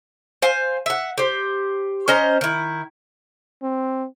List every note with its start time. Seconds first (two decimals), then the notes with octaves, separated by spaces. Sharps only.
0.42 C5 F5 G#5
0.86 E5 F#5
1.18 G4 C5
2.08 C#4 C5 D#5 A#5
2.41 D#3 E4
3.62 C4